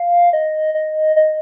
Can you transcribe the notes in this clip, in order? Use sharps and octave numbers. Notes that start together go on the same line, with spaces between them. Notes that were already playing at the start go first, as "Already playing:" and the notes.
Already playing: F5
D#5
D#5
D#5